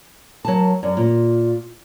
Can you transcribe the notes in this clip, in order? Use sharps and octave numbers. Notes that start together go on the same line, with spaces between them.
F#3 A#4 A5
F#2 D5
A#2 F4